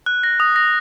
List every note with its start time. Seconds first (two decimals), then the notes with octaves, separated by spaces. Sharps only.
0.06 F#6
0.23 A#6
0.40 D#6
0.56 A#6